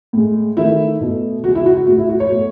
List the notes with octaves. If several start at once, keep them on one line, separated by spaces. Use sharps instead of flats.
A2 G#3
D#3 A3 E4
B2 A3
C#3 G#3 F#4
E4
F#4
F#4
A2 G#3 F#4
E4
F#4
C#5
B2 A3